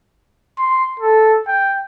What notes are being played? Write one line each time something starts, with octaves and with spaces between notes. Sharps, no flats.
C6
A4
G5